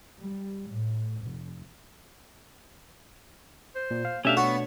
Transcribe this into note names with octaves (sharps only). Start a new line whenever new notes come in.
G3
A2
F1
C5
A#2
F5
B2 A3 C#4 D4 G4 E5 F5
B3 F#4 C#5